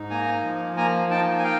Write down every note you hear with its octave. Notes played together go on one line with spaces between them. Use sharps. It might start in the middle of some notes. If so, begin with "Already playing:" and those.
Already playing: G#2 D#4
A#3 G#5 A#5
F3
A#3 G#5 A#5
D#4 G5 A5
G#5
F5 G5